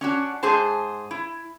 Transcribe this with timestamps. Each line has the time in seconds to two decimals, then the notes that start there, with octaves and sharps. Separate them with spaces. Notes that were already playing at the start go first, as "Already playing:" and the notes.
0.01 C#4 D4 F#4
0.43 G#2 G#4 C5 A5
1.11 E4